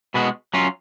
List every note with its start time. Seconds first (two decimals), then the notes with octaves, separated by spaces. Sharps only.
0.14 B2 G#3 B3 F#4
0.54 F#3 C#4 F4